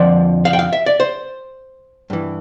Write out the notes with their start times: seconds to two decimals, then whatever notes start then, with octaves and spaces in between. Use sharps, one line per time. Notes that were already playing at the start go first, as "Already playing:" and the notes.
Already playing: F2 D3 F3 D5
0.45 F5
0.53 G5
0.59 F5
0.73 E5
0.86 D5
1.00 C5
2.10 G2 E3